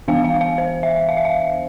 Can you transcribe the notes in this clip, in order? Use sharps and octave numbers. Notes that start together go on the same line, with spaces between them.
E3 B3 D4 F5
F5
F5
C5
E5
F5
E5
F5